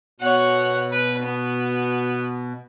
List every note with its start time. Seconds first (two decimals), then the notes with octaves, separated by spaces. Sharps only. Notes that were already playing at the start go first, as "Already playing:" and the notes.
0.20 B2 C#5 F#5
0.92 B4
1.23 B3